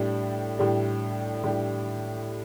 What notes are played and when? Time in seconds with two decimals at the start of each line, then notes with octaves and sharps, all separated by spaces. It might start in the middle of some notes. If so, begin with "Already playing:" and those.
Already playing: A2 G3 D4 G4
0.59 A2 G3 D4 G4
1.44 A2 G3 D4 G4